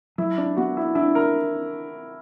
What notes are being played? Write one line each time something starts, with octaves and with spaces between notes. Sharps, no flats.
F#3 E4
D4
B3 F#4
E4
D4 E4
A#4